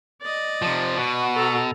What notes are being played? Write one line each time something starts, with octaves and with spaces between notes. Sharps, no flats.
D5 D#5
C3 F3
B2 F#4
A4 A#5